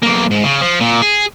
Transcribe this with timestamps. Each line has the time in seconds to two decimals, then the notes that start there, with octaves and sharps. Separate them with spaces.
0.02 B1 A#3
0.31 G#2
0.44 C#3
0.61 F3
0.81 A#2
1.02 G#4